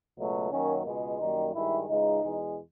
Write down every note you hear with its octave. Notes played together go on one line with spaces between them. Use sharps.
C#2 B2 F#3 A3
F#2 D#3 F#3 A#3 C#4
C#2 B2 G#3
F#2 D#3 G3 A#3 D#4
G2 D#3 G#3 E4
C#2 C#3 E3 G#3 D#4
E2 B2 G#3